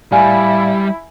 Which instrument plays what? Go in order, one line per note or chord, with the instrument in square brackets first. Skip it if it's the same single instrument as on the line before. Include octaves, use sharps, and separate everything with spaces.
[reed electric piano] A2 D5 F5 [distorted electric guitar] G3 [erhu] E4 [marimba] G#5